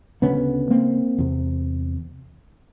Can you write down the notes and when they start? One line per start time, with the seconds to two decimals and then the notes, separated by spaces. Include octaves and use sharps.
0.22 D2 C#3 B3 C#4
0.70 A#3 C4
1.18 E2 C3